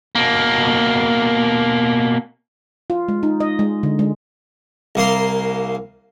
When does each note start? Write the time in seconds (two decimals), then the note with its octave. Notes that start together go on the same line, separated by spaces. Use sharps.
0.15 B2 A#3
2.90 F4
3.08 G#3
3.23 D#4
3.40 D#5
3.59 G#3
3.83 D3
3.99 G#3
4.95 C2 A#3 C6